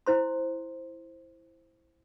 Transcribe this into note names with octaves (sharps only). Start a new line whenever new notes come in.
E4 C5 C6